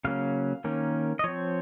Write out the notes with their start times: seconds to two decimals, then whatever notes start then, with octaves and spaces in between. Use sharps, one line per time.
0.04 C#3 F#3 A#3 C#4 F5
0.64 D#3 A#3 C#4
1.19 D#5
1.24 F3 C4 C#5